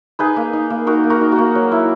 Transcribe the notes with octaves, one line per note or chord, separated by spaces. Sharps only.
D#4 G#4 B4
A#3
D#4
A#3
D#4 F#4 A#4
A#3
F#4 A#4
D#4
F#4
A#3
F#3
E4